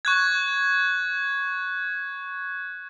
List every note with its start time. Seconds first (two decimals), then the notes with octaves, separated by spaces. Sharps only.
0.05 C#6 F#6 G#6